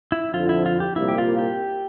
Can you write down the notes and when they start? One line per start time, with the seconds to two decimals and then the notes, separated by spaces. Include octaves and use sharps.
0.12 E4
0.34 F2 D3 F3 F4
0.49 E4
0.66 F4
0.80 G4
0.96 C2 A#2 G3 A#3 E4
1.08 G4
1.18 F4
1.39 G4